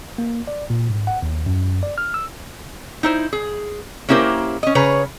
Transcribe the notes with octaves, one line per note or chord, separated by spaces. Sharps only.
A#3
D5
A#2
G#2
F#5
D#2
F#2
D5
F6
E6
D#4 E4 C5
G#4
A#3 C#4 E4 G4 A#4 C5
C#4 D#5
C#3 G#4 B4 C#5 A#5